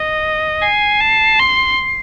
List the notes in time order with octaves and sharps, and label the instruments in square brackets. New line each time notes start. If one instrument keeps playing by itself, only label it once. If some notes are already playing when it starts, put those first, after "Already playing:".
Already playing: [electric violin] D#5
[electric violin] G#5 [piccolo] C7
[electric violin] A5
C6